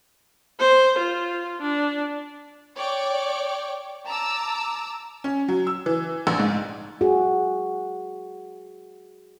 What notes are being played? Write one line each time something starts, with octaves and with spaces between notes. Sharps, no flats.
C5
F4
D4
C#5 D5 G5 C#6 D6
A5 A#5 D6 E6
C#4
F#3
E6
E3
A#1
G#2
F#4 G#4